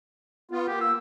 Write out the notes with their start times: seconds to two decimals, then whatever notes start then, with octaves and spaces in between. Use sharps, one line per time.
0.51 B3 F4
0.68 A#3 G4
0.81 E6